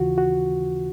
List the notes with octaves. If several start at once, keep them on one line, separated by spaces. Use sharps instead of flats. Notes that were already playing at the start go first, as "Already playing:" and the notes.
Already playing: D#2 C#3 E3 F4 F#4
F#4